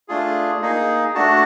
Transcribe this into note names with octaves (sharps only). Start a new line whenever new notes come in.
A3 D4 F4 G#4
A#3 D#4 G#4
A3 D4 F#4 A5